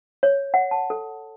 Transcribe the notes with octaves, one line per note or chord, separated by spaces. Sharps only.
C#5
F#5
A5
A4